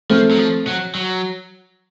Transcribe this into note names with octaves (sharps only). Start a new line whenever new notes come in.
F3 A3 C4
F#3
F3
F#3
F#3